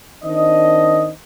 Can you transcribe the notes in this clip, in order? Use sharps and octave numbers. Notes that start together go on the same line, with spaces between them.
D#3 C4 D4 D#5